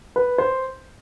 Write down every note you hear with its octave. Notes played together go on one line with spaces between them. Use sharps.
B4
C5